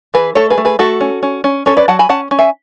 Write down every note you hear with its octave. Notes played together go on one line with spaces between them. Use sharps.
E3 G#4 B4
A3 A4 C#5
G#4 B4
A3
G#4 B4
A3 F#4 A4
C#4
C#4
C#4
C#4 A4 C#5
B4 D5
F#3 F#5 A5
G#5 B5
C#4 F#5 A5
C#4
E5 G#5